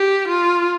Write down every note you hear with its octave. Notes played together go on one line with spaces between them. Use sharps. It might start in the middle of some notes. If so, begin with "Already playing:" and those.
Already playing: G4
F4